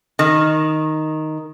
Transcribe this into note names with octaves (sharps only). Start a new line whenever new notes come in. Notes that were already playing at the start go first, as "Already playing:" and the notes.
D#3